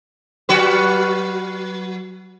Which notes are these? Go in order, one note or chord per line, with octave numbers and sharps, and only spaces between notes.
F#3 F#4 B4